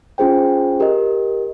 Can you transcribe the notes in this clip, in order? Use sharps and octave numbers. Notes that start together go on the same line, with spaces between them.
C#4 F4 G#4 C5 G5
G4 A#4 D#5